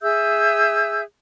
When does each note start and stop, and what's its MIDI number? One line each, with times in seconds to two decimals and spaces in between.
0.01 1.01 68
0.01 1.01 76
0.01 1.01 88
0.01 1.01 91